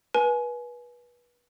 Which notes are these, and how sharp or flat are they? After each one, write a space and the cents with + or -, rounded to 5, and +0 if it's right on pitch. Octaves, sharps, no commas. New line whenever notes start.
B4 -30 G#5 +25